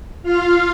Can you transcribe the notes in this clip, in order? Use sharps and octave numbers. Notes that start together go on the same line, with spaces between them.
F4 F5